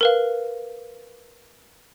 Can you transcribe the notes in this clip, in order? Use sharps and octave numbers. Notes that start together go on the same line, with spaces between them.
A#4 B4 F5